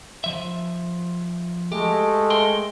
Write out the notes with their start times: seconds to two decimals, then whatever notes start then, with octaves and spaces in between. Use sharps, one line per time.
0.24 F3 E5
1.72 G#3 A3 G4
2.30 A#4 G5 C6